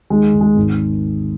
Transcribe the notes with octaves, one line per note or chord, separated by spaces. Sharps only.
D#2 G#3
D#2
G#3
G#1